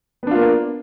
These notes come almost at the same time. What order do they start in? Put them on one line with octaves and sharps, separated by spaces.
B3 D4 F4 A#3